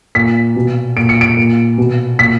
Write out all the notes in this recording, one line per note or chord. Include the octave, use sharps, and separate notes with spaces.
A#2 B6
B2
A#2 D7
C#7
D7
A#2
B2
A#2 B6